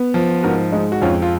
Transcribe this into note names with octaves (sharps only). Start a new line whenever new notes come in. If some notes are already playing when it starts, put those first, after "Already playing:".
Already playing: B3
F3
G#2 F#4 A#4
G#3 D#4
F#4
F2 C#4 F4
F4